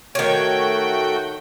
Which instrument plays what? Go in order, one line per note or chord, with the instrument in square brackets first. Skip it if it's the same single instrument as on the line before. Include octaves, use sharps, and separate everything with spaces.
[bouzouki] D#3 C#5 [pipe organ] A3 F#4 G5